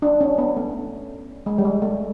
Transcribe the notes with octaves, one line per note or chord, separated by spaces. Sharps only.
D4
C#4
B3
A3
G#3
G3
G#3
A3